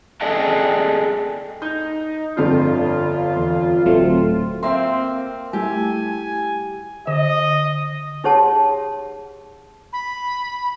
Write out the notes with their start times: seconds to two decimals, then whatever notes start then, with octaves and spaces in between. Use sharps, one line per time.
0.21 G#4 A4 D5 D#5 G5 A5
1.62 D#4 G6
2.37 G1 F2 D4 F4
3.36 E2
3.85 D1 F#3 A3 C4 F4
4.63 A#3 C4 E5 F5 C6
5.53 G3 A3 E4 G4 G#5
7.07 D3 D#5
8.24 D#4 G4 G#4 C#5 F#5 A5
9.93 B5